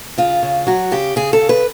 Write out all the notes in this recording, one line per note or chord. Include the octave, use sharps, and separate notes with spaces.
C#3 F4
C#3
F#3 F#4
C#3 G4
C#3 G#4
A4
C#3
B4